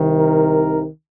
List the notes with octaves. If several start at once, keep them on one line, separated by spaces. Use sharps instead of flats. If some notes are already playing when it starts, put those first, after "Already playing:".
Already playing: C2 C3 D#3
A#4